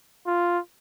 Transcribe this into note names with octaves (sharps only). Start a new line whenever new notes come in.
F4